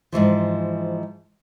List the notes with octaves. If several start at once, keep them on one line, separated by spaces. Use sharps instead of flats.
G#2 B2 E3 F3